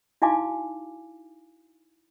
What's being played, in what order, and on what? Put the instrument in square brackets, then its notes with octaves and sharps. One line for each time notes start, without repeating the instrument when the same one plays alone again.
[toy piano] D#4 E4 F#4 F5 G#5 D6